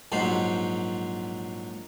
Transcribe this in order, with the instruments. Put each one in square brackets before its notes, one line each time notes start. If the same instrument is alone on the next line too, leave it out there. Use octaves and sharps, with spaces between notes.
[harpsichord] A#1 G#2 F#3 C5